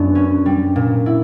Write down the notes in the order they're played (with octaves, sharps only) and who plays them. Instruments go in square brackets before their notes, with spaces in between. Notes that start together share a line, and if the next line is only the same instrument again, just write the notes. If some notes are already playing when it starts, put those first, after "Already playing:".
Already playing: [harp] F#2 B3 [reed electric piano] D4
[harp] C#4
G3
A#2
E4